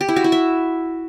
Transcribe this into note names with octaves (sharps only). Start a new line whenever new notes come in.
G4
E4
F#4
E4
E5